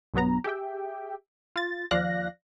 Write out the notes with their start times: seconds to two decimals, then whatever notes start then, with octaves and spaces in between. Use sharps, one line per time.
0.14 B1 G2 F#3 B3 A#5
0.44 G4 G#4 E5 G5
1.56 F4 A6
1.91 D#2 F3 D5 F5 F#6 A#6